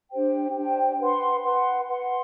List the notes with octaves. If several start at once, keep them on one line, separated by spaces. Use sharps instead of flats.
D4 G4 C5 G5
D4 G4 C5 G5
B4 F#5 C6
B4 F#5 C6
B4 F#5 C6